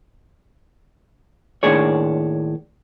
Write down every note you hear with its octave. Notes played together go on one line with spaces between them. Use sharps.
D#2 A2 D#3 D4 G#4 C#5